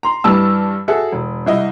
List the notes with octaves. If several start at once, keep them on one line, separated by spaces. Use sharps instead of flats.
A#5 C6
G2 E3 G3 A5 E6
F#4 G#4 A4 E5
E1
C2 E4 D#5